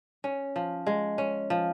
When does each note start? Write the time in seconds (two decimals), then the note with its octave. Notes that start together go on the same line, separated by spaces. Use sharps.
0.24 C#4
0.56 F3
0.87 G#3
1.18 C#4
1.50 F3